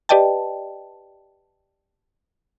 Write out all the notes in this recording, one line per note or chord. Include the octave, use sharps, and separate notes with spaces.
G4 B4 D5 D#5 G5 A5